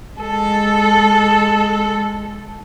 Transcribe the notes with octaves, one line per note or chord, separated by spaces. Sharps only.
G#3 A4